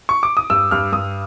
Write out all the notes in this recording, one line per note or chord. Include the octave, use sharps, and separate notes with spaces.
C#6
D6
D#6
G2 E6
G2 F6
G2 D#6